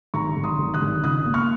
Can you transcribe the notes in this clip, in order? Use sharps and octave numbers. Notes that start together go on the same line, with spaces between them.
G#1 A#5 C#6
G#1
C6 D#6
G#1
D#6 F#6
G#1
C#2 D#6 F#6
A#3
C#6 F6